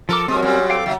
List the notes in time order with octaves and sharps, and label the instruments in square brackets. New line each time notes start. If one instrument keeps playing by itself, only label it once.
[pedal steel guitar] F3 D6 [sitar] A4 A#4
[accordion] F2 E3 D#6 [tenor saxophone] F#3 [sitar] G#3 [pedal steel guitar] C4 G4 A#4
[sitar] A#2 G3 [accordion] C#4
[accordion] C4 A4 D6 [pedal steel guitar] F5 G5
[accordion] D#2 C#3 E4 [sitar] F#3